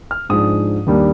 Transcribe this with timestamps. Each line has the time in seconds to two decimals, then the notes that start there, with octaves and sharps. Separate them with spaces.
0.11 F6
0.29 G#2 F3 G#3 D4 D#6
0.87 D#2 D#3 G3 A#3 D4